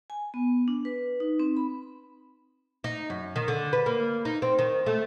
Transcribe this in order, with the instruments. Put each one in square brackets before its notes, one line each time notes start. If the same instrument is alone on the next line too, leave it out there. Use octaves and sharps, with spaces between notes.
[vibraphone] G#5
B3
D4
B4
D#4
C4
B5
[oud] D#4
F#2
D#3
D3
B4
A#3
D#4
C4
D#3
A3